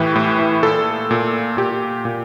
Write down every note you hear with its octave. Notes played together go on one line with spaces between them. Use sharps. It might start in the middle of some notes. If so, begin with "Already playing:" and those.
Already playing: A2 E3 G4
A2
E3
A#2 A4
A#2
A#2 G4
A#2